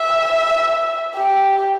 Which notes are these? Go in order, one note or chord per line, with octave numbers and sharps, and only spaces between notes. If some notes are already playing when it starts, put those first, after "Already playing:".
Already playing: E5
G4